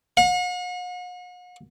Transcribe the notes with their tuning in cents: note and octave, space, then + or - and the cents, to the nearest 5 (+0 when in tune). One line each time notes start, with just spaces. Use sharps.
F#5 -45